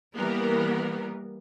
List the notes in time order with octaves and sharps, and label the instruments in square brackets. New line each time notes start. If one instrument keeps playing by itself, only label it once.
[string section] E3 B3 A#4 [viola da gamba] G3 A#3